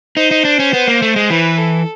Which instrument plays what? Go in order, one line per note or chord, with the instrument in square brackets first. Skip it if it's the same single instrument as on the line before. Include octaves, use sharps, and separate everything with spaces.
[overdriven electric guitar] D#4 [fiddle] C5
[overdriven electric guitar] D#4
D4
C#4
B3
A#3
A3
G#3
[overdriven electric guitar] E3 [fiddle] B4
[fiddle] A4